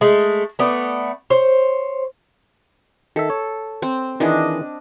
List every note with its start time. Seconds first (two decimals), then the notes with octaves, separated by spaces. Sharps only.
0.01 G#3 A3
0.59 A3 B3 D5
1.30 C5 C#5
3.16 D#3 A4 E5
3.30 C#5
3.82 C4
4.20 D#3 E3 D4 G#4 D#5